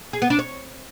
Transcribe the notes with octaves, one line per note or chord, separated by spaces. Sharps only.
G#4
B3
D4
C#5